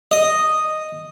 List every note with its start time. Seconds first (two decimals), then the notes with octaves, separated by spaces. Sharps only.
0.11 D#5